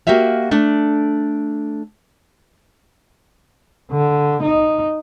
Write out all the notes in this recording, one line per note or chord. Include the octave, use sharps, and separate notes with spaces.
A#3 F#4 G4 E5 F5
A3 D4
D3
D#4